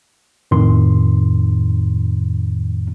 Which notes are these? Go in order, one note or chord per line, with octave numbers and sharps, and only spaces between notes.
F2 A2 D#3 C6